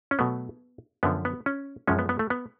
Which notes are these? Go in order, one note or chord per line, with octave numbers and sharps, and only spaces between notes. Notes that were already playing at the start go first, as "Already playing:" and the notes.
C#4
B2 F#3 A3 B3
F#2 D3 F3 B3
B3
C#4
F#2 F3 G#3 C#4
B3
B3
A3
B3